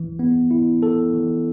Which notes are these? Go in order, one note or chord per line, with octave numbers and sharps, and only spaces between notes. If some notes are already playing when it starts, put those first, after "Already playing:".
Already playing: E3
B3
E4
A4
E3